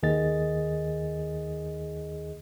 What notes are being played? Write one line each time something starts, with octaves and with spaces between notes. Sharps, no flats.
D#2 D#3 G#4 D#5 A6